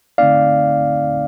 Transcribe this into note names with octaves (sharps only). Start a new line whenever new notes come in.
D3 A3 C4 D#4 D5 F5